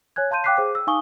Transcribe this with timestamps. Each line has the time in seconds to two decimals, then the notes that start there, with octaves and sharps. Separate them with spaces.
0.16 C#5 G#5 F#6 G#6
0.31 F5 A5 C6 G6 D#7
0.44 F5 G5 D6 F#6 B6 C7
0.57 G#4 C5 D6
0.75 E6
0.87 D#4 F5 G#5 C#6 D#6 G7